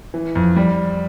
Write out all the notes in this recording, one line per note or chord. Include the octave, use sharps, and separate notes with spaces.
E3
F2
G3